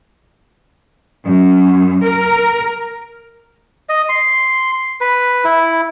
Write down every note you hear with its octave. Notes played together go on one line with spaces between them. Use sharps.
F#2
A#4
D#5
C6
B4
E4